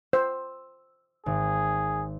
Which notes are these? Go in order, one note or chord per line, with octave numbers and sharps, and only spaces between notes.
C5 E6
G#1 G#4